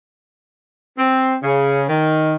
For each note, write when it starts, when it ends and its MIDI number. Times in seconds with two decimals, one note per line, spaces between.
0.98 1.35 60
1.43 1.84 49
1.89 2.36 51